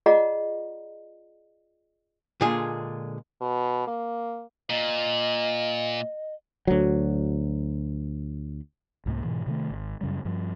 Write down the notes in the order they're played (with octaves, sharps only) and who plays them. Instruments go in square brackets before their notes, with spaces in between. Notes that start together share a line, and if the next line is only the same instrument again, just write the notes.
[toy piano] F4 G#4 D5 D#5 F#5 A#5
[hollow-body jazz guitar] A#2 D3 G#3 F4 G#4
[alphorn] B2
A#3
[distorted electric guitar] A#2 [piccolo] D#5
[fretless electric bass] D2 F#3
[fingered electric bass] C2 G#2 G3 A#3
G#2 B2 E3
C3 D#3 A3
G#1
F#2 C#3 G3
G2 F3